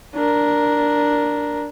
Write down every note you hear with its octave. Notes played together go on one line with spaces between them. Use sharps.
D4 A#4